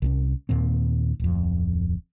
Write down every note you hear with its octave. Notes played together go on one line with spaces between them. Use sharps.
C2 C4 C#4
D#2 A#2 D#3 C4
D1 F2